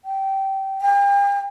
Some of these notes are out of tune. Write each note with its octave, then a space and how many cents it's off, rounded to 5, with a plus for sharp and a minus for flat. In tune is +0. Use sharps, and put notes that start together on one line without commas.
G5 -20
G5 +40